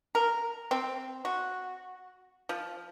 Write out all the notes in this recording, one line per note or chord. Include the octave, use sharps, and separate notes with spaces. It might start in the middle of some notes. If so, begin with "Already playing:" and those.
A#4
C4
F#4
F3